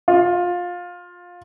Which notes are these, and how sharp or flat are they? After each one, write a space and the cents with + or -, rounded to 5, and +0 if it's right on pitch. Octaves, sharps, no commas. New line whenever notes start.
F4 +20